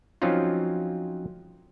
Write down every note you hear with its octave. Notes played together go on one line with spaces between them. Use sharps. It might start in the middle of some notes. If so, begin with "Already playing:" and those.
F3 F#3 C4 C#4 D#4 F4